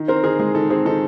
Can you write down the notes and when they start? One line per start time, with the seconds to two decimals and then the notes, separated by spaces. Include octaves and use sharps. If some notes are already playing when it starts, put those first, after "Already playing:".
Already playing: D#3
0.08 C4 A#4 C5
0.24 D#3 G#4 A#4
0.39 G#3 G#4
0.55 D#3 A4
0.70 C4 G#4
0.85 D#3 A4